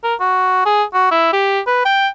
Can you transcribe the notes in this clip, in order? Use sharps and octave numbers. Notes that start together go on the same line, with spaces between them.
A#4
F#4
G#4
F#4
E4
G4
B4
G5